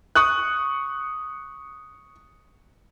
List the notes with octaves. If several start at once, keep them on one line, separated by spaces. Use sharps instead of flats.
C#6 D#6 F#6